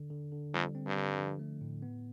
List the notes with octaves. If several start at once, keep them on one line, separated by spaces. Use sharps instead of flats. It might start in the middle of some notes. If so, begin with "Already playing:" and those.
Already playing: D3
D3
D3
F2 G3
C4
G2
D3
F3
A3
A2
B3